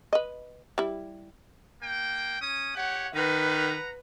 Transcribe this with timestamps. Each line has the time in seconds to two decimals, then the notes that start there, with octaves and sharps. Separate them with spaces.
0.13 B4 D#5
0.78 G3 E4
1.82 A#3 G5
2.41 C#4 G#5 D#6
2.76 G4 C#5 F#5
3.15 D#3 B4 F#5 A#5